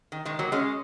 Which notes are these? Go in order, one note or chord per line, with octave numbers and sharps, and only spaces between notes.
D#3
D#3 G#3
F#3 A#3
G#3 C#4